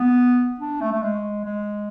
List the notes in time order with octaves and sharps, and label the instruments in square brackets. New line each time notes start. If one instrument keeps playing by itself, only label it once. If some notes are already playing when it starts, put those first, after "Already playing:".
Already playing: [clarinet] B3
D4
A3
A3
G#3
G#3